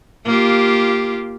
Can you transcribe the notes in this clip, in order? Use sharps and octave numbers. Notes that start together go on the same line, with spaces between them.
A#3 F4 G4